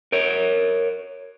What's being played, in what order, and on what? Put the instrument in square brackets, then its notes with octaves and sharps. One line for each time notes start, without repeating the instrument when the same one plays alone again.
[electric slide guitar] A#4 C#5